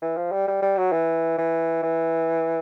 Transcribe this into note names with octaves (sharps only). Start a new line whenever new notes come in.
E3
F3
G3
G3
G3
F#3
E3
E3
E3